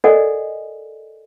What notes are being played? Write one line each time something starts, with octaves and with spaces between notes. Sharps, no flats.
A4 A#4 D5 D#5 F#5 G#5